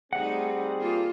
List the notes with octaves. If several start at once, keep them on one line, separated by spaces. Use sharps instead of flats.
G3 A3 C4 D#4 G#4 F#5
A#3 F4 A4